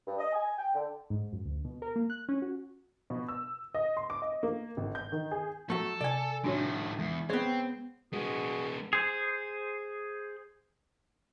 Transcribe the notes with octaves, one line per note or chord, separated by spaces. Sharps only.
G2
D#5
G#5
G5
D3
G#2
F#2
D2
B2
A#4
A#3
F#6
C#4
F#4
B2
E6
D#5
C6
D6
D#5
A#3
G#1
G6
D#3
G#4
F#3 A3 A4
C3 D5 G#5
A2 D#3 D4 F#4 C#5
E2 G#3
B3 C4 G#4 C#5
G#3 B3 F#4 G#4
G#4 C5